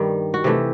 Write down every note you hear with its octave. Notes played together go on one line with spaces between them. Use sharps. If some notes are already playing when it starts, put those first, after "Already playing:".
Already playing: G2 D#3 G3
F#4
C3 E3 A3 G4